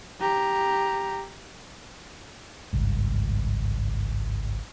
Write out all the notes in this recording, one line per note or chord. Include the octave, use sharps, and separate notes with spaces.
G4 A#5
G#1 C#2 G2